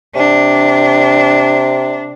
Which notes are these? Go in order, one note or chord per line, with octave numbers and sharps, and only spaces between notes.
C3 D4